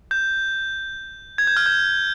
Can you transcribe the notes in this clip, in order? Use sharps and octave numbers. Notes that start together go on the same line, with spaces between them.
G6
G#6
G6
F6
G6